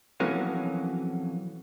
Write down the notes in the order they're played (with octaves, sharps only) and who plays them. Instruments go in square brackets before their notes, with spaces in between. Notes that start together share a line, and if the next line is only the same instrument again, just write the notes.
[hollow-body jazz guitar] F2 B2 E3 F#3 A#3 C#4